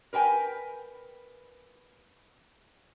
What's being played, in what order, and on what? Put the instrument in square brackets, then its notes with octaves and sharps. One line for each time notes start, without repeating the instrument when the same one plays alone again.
[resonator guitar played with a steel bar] A#4 B4 G5 G#5